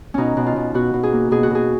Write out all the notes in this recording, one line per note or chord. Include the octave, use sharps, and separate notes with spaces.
B2 C#4 D#4
B2
F4
B2
B2 F#4
B2
G#4
A#3
B2 G#4
F#4
B2 G#4